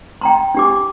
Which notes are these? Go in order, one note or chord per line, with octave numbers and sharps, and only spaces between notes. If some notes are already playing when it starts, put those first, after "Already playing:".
G5 A#5 C6
D4 G4 D6